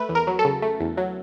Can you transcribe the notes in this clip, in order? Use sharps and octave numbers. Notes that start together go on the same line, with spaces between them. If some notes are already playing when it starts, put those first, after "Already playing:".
Already playing: A3 B4
E2
A#4
F#3
A4
C#3
A3
E2
F#3